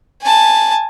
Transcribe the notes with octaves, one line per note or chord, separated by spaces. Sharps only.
G#5 A5